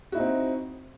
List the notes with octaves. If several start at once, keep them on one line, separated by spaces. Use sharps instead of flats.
C4 D#4 E4 F#4